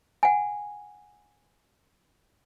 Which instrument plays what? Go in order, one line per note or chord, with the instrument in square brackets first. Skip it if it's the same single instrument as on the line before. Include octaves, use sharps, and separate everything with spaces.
[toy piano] F#5 G#5